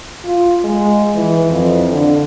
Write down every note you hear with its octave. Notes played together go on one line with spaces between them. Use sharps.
F4
G#3
E3
F2
D3